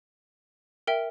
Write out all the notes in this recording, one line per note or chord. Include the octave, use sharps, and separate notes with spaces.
A#4 E5 G5